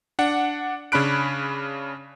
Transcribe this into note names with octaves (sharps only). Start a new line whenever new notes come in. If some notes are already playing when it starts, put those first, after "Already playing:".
D4 F#5
C#3 C#4 D4 B5 F#6 D7